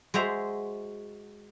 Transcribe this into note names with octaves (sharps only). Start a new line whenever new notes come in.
G#3 F#4 C5 E5 A#5